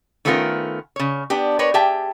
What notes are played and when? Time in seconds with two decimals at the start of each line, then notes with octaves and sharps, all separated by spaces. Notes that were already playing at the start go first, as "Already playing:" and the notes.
0.25 D#3 A3 B3 C#4 F4 A#4
0.96 C#3 C#5
1.30 B3 D4 G4
1.59 A#4 B4 C#5 D5
1.74 G4 G#4 E5 G5 A5